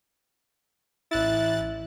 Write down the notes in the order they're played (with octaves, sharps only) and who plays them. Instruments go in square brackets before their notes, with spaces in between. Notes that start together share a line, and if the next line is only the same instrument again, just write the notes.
[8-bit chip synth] A1 F#6 A6 [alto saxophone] E4